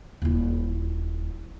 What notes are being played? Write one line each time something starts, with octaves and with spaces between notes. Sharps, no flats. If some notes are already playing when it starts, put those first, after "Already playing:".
D#1 E4